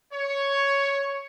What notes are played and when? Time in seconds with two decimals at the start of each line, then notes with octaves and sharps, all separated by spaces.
0.13 C#5